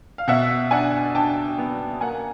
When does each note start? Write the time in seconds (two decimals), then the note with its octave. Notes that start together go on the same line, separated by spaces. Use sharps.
0.18 F5
0.28 B2 E5 F#5
0.71 D4 F#5 G#5
1.15 D4 G5 A5
1.58 B3
2.01 A#3 F#5 G#5